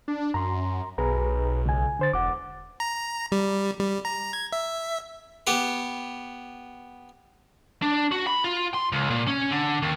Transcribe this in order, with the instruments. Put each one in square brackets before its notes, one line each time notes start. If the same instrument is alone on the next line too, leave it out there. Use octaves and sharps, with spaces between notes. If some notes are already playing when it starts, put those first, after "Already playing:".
[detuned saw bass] D4
[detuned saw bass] F#2 [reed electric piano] A#5 C6
[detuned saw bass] B1 [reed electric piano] G#4 B4 A#5
[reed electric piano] C#2 G#5
D3 C5 A6
[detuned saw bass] E1 [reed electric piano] F#5 D6
[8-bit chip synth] A#5
G3
G3
A#5
G#6
E5
[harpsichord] B3 G4 B4
[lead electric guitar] D4
F#4
B5
F4
C6
C#2
A#2
C#4
D3
D#2